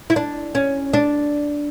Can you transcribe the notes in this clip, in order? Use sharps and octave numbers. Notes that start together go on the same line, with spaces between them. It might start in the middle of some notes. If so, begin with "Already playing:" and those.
E4
D4
C#4
D4